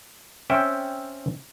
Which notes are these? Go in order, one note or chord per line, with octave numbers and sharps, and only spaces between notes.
C4 C#4 E5 G5